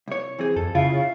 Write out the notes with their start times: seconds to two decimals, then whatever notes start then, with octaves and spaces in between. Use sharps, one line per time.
0.08 C2 C#5
0.39 E3 C4 G#4
0.56 F2 A4
0.75 C#3 E4 F4 F5